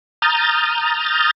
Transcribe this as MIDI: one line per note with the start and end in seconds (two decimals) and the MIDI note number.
0.22 1.31 82
0.22 1.31 87
0.22 1.31 89
0.22 1.31 91
0.22 1.31 93